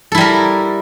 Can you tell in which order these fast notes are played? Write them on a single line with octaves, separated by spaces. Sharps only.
A4 E4 G3 A#4